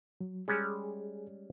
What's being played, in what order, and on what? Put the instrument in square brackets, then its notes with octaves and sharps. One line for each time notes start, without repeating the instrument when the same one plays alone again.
[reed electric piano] F#3
[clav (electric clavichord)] G3 G#3 C#4 [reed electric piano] G#4